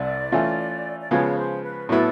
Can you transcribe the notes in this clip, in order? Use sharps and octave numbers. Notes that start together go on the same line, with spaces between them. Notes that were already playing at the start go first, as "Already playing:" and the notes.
Already playing: C2 C3 D5
E3 A3 C#4 F4
D5
C#3 F3 G#3 B3 C#5
C5
B4
A2 F#3 B3 E4 A4